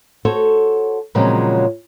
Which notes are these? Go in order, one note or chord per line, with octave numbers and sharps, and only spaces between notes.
F#4 A4 C5 C#5
A#2 C#3 F3 F#3 G#3 C4